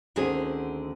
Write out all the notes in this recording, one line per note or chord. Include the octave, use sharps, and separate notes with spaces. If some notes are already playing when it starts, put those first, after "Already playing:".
D2 D3 D#3 C4 C#4 G#4